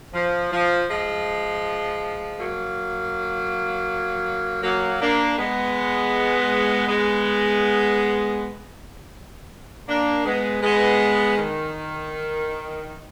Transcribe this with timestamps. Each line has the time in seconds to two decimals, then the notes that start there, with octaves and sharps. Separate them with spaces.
0.14 F3
0.52 F3
0.88 F3 G#3
2.38 F#3 A#3
4.63 F#3 A#3
5.00 A#3 D4
5.38 G#3 B3
6.88 G#3 B3
9.88 A#3 D4
10.25 G#3 B3
10.63 G#3 B3
11.37 D#3